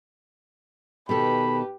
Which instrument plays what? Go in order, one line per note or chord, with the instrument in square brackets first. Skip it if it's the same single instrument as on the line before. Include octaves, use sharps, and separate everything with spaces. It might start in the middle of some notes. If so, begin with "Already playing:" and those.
[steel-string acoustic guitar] B2 D#3 A4 [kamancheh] G4 B4 [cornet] B5